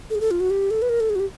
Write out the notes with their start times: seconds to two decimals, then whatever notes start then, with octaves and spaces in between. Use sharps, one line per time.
0.10 A4
0.15 G#4
0.21 A4
0.31 F4
0.40 F#4
0.50 G4
0.71 A4
0.82 B4
0.89 A#4
1.00 A4
1.10 G#4
1.15 F#4
1.20 G4